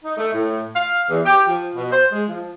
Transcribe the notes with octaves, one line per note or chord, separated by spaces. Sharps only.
D#4
A3
A2
F5
E2
G4
F3
B2
C5
G#3
F3